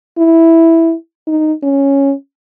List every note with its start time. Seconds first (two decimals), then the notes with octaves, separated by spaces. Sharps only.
0.18 E4
1.27 D#4
1.63 C#4